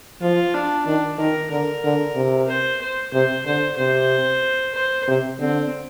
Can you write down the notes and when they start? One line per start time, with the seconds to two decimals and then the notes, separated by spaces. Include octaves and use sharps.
0.21 F3 F4
0.54 D4
0.86 D#3 D4
1.18 D#3 A#4
1.51 D3 A#4
1.84 D3
2.16 C3
2.48 C5
2.81 C5
3.13 C3 C5
3.46 D3 C5
3.78 C3 C5
4.75 C5
5.08 C3
5.39 D3 C4